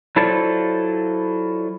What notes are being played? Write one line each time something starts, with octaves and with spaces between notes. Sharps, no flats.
F#3 E4 F4 A4 C5 D5